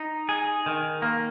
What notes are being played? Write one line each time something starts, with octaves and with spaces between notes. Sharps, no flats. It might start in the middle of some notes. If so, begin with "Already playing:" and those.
Already playing: D#4
G#4
D#3
A#3